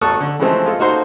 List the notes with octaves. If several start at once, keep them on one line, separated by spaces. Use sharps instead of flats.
G#1 A4 A5 C#6 D#6 F#6
D3
E3 F3 G#3 A3 C4
G#3 F4 A4
A#3 D#4 F#4 A4 C5